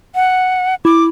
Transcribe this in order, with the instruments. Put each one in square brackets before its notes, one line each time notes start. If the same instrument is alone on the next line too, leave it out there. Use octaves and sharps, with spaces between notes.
[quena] F#5
[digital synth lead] E4 [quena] D6